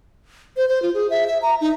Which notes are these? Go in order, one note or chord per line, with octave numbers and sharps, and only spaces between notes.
C5
C5
F4
G#4
E5
E5
A#5
D#4